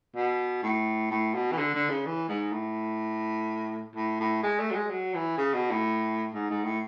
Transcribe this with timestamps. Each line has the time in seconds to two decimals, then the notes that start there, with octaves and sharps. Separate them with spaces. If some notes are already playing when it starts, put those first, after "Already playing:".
0.15 B2
0.63 A2
1.10 A2
1.34 B2
1.52 E3
1.58 D3
1.74 D3
1.89 C#3
2.06 E3
2.29 G#2
2.52 A2
3.95 A2
4.20 A2
4.43 G#3
4.60 A3
4.71 F#3
4.75 G#3
4.90 F#3
5.14 E3
5.38 C#3
5.53 B2
5.70 A2
6.34 G#2
6.50 G#2
6.64 A2